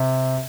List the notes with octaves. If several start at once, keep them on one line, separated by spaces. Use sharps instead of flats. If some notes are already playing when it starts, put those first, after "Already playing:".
Already playing: C3